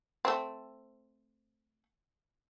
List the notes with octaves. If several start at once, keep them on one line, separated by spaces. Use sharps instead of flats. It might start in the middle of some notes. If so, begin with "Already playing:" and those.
A3 C4